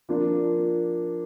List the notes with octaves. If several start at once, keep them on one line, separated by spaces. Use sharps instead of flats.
F3 A#3 D4 F4